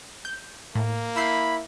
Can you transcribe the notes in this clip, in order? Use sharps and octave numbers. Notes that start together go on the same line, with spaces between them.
G6
A2 A#3
E4 B5 E6 G6 C7